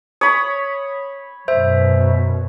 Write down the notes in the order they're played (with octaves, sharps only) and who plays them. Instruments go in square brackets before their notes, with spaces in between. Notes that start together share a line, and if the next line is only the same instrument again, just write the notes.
[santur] C#5 B5 [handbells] D#6
[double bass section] F#2 B2 [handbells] C5 E5